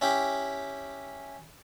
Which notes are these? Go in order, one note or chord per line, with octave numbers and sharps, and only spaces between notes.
C#4 E4 G4